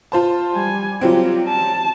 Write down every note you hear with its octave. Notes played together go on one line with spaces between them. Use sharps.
F4 C5 A5
G3 G#5
F#3 G3 C4 F4 G4
A5